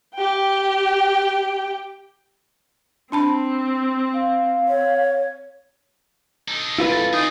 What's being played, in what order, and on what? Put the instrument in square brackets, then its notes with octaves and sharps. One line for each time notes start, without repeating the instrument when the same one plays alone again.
[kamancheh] G4 G5
[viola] C4 [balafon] D4 A5 B5
[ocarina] F5
[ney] C#5
[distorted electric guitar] D#4 A4
[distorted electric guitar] F2 G#2 [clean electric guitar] E4 F4 B4
[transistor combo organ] A4
[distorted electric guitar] C4 G#4 [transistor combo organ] D#4